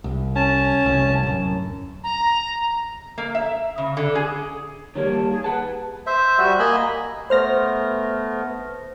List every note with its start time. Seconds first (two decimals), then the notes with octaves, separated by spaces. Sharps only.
0.04 C2
0.36 C#4 A5
0.85 F1 C2
1.23 D1 F#2
2.04 A#5
3.18 A#3
3.35 E5
3.78 C#3
3.97 D3
4.15 G#4
4.95 D#3 G3 A#3 C#5
5.11 A5
5.31 G#4
5.44 B4 F#5 A5
6.06 C5 E5
6.39 G3 F#4 E5
6.59 A#3 D#5 G#5 B5
7.30 A3 B3 C5 F6 A#6